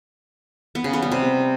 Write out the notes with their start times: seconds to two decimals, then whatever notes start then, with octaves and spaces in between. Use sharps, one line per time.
0.75 B3
0.84 C#3
0.93 B3
1.02 G3
1.12 C3